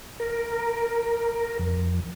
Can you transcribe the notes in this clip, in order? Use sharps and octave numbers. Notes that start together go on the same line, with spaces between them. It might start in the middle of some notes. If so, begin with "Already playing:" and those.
A#4
F2